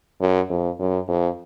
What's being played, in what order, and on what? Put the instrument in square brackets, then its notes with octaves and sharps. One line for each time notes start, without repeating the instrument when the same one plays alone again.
[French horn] F#2
F2
F#2
F2